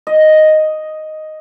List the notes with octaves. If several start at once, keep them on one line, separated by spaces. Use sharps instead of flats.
D#5